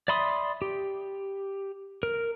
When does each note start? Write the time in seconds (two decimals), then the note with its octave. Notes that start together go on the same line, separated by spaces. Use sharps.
0.08 D5 E5 B5 C6 D#6
0.62 G4
2.03 A#4